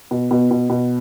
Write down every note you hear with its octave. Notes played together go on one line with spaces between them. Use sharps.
B2
B2
B2
B2